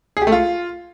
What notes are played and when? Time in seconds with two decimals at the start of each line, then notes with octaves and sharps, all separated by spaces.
0.17 G#4
0.22 G4
0.27 A3
0.32 F4